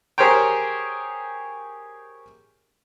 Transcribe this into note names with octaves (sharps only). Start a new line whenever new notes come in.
G4 G#4 A#4 C5 C#5 G5